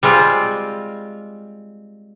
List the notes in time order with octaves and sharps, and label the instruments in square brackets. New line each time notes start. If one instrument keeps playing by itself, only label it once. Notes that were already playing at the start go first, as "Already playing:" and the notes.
[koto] G3 G#3 C4 F4